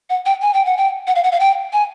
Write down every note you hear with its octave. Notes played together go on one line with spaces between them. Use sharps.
F#5
G5
G#5
G5
F#5
G5
F#5
F5
F#5
F5
G5
G#5